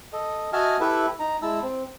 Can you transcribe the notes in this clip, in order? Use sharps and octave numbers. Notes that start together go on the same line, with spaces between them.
A4 D#5
F#4 D#5 E5 G#5 A5 F6
E4 G4 A4 B4 E5
D#4 A#5
G#3 E4 A5 E6
C4